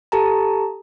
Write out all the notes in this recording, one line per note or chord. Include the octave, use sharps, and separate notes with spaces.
G4 A4 A5 A#5